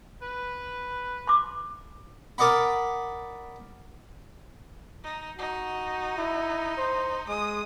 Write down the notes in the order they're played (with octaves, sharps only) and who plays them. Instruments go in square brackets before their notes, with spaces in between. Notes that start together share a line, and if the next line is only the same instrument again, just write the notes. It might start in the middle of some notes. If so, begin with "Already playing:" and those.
[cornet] B4
[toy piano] C6 D6
[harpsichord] A#4 D5 D#5 F#5 B5
[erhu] D#4
[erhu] D#4 [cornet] F#4
[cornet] E4
C5
[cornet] G#3 [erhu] D#6